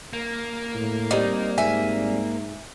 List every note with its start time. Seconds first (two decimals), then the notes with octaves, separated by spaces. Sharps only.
0.13 A#3
0.75 A2
1.11 G3 C4 D#4 D5
1.58 G#2 E5 G#5